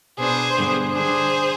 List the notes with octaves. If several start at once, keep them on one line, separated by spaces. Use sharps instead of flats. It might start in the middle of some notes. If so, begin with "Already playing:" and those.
B2 B3 D4 G#4 C5
G2 D3 G3 B3
D3 G3 D4 G#4 C5